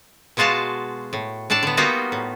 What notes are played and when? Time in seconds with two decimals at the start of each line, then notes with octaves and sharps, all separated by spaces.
0.37 B2 G#3 F4 F#4 F5 A5
1.13 A2
1.50 A2 D4 A4 D5 A5
1.63 D3 B3
1.77 G3 A#3 B3 D#4 F4 F#4
2.12 A2